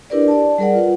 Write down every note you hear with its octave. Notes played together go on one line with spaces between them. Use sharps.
D4 E4 G4 A#4 B4 D5
D5 A5
G3 G#4 A#4 D5 F#5
F4 B4 F#5